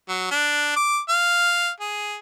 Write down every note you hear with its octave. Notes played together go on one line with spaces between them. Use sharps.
F#3
D4
D6
F5
G#4